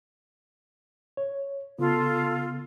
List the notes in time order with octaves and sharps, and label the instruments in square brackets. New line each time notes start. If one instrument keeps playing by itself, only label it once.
[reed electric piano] C#5
[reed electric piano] C#3 B3 [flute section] F4 A4